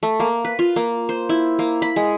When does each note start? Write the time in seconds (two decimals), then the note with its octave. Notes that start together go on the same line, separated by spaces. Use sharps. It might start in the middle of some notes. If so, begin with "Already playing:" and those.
0.03 A3
0.20 A#3
0.45 B4
0.59 F4
0.76 A#3
1.09 C5
1.29 E4
1.59 A#3
1.82 B5
1.96 G#3